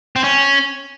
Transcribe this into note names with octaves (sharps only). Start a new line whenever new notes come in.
C4
C#4